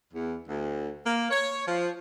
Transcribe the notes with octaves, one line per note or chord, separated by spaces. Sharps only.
E2
D2
A#3
C#5
F3